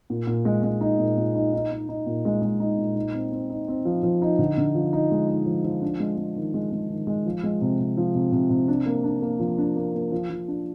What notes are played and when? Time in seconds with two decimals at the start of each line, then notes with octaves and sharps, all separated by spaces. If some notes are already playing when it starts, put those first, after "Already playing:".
0.10 A#2
0.27 A#2
0.45 G#3
0.63 G#3
0.81 D#4
0.99 A#2
1.17 A#2
1.35 D#4
1.54 D#4
1.71 D#4
1.89 D#4
2.06 A#2
2.25 G#3
2.42 G#3
2.60 D#4
2.78 A#2
2.96 D#4
3.14 C4
3.32 C4
3.50 D#4
3.68 C4
3.85 F3
4.03 F3
4.22 D#4
4.39 D3
4.58 D3
4.75 F3
4.93 D#4
5.11 G#3
5.29 D#4
5.46 F3
5.64 F3
5.82 D4
6.00 G#3
6.18 G#3
6.36 D#3
6.54 G#3
6.72 G#3
6.90 D#3
7.07 G#3
7.26 F3
7.43 G#3
7.61 C3
7.80 C3
7.97 F3
8.15 C3
8.32 C3
8.50 C3
8.68 D4
8.86 A#3
9.04 D4
9.22 A#3
9.40 F3
9.58 D4
9.76 A#3
9.94 A#3
10.12 F3
10.30 F3
10.48 D4